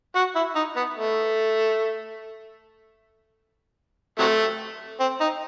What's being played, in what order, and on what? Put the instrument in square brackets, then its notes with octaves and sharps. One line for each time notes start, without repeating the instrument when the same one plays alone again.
[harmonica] F#4
E4
D#4
B3
A3
C3 F#3 A3
C4
D#4